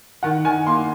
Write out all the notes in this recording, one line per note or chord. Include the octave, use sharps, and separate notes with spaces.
D#3 F#5
D#3 G#5
A#3 C6